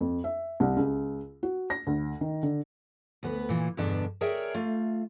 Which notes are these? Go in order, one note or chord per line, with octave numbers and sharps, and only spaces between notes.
F2
E5
C2
C#2
F#4
A#6
D2
D#3
D3
D2 B3 B4
A#2 E3
E2 G2 B2 D3 B3 D4
G#4 A#4 C#5 D5 E5 G5
A3 F4